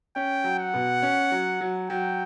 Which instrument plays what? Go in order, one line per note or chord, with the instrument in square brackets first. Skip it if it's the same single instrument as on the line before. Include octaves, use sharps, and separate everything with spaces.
[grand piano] C#4 [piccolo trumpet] G5
[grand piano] F#3
[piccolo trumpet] F#5
[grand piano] B2
C#4
F#3
F#3
[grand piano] F#3 [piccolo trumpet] G5